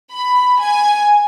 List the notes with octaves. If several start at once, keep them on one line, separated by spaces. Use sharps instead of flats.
B5
G#5